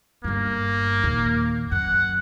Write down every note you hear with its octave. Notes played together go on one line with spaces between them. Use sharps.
G1 G2 A#3
D#2 A#2
F#2 F#5